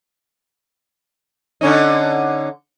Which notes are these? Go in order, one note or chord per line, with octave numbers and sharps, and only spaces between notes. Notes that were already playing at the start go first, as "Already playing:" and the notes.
D3 C#4 D#4